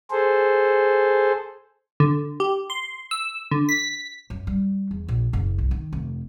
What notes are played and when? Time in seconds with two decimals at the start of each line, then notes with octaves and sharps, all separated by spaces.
0.11 G#4 A4 C5
2.00 D3
2.40 G4
2.70 C6
3.11 E6
3.51 D3
3.69 B6
4.30 F#2
4.47 G3
4.91 E2
5.08 A#1
5.33 F#1
5.58 C2
5.71 D#3
5.93 F1